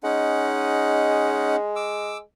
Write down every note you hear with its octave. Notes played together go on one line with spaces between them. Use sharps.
G#3 C#4 D#4 F#5
D6 E6